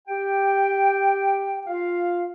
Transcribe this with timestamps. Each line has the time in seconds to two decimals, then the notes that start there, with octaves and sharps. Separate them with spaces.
0.08 G4 G5
1.67 F4 F5